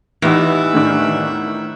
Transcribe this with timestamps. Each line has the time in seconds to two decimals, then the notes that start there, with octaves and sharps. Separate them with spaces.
0.22 E2 E3 D#4 G4 E5 F#5
0.73 A2 D#3 D4